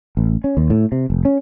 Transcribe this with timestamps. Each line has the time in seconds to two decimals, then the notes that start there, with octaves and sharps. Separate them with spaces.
0.17 A1
0.44 C#4
0.57 D#2
0.70 A2
0.92 C3
1.10 F1
1.25 C#4